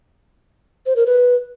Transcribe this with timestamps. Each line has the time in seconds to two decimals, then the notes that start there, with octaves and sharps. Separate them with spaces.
0.86 C5
0.96 A#4
1.06 B4